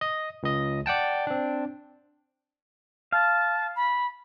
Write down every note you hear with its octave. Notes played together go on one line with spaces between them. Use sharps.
D#5
C#2 D#5
D5 F#5 G5 A5
C4 D4
F5 A5
B5